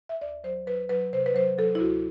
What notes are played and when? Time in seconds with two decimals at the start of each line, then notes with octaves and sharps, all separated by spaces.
0.09 E5
0.21 D2 D5
0.44 F#3 C5
0.67 F#3 B4
0.89 F#3 B4
1.13 C3 C5
1.26 B4
1.35 F#3 C5
1.58 F#3 A4
1.75 E4
1.80 D2 F#4